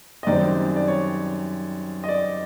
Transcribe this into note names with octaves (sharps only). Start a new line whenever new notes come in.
D#5
F#2 D#3 G3 C4 D5
D5
C#5
D#5
D5